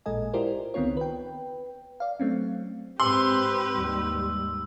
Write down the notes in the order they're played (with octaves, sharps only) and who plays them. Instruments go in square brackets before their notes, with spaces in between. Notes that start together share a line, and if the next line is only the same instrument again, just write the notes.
[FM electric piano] A1 A#2 G#3 A4 D#5 G#5
E4 F4 G4 A#4 C5 D5
C#2 D#3 B3 C4 F4 C#5
B4 G5
D5 F5
F#3 A3 C4 C#4
[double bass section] G#2 C4 [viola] G4 B4 [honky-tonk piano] C6 [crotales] E6
[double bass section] D#2 G#2 G3